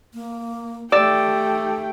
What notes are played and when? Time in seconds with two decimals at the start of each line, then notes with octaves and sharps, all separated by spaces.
0.14 A#3
0.92 A3 G4 D5 G5 D6 E6 A6